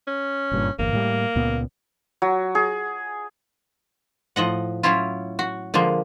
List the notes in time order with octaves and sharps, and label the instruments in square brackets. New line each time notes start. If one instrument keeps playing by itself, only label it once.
[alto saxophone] C#4
[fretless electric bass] F#1 G2 A#2
[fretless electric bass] G1 E2 [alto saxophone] A#3
[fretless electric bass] A2 G3
C#2 A#2 B3
[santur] F#3
G#4
[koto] A2 F3 D#5 F#5
F#3 C#4 E4 F4
F#4
D3 F3 G#3 A#3